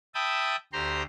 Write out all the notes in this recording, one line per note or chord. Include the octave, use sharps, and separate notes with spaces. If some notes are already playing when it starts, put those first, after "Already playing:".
E5 G5 A5 B5 D#6
D2 G4 C5 A#5 C6